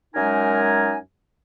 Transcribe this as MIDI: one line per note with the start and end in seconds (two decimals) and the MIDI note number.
0.15 0.96 42
0.15 0.96 56
0.15 0.96 63
0.15 0.96 70
0.15 0.96 80